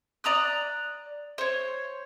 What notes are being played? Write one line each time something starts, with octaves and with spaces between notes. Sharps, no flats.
D5 A#5 D#6 F#6
C5 C#5